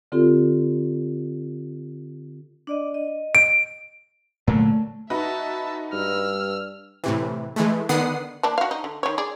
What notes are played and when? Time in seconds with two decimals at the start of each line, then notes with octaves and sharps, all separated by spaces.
0.12 D3 C4 F4 G4 A4
2.67 D4 D5 D#5
2.94 D#5
3.35 D7
4.48 A#2 D3 F#3 A3
5.10 D#4 F#4 B4 E5 A5
5.93 G2 E6 F6
7.04 A2 C3 E3
7.56 E3 G#3 A3
7.89 D3 D#3 B3 F#5 D#6 C7
8.43 A#3 D4 A5
8.58 F#4 F5
8.71 D#4
8.84 D3
9.03 D#3 C#5
9.18 G#4 D5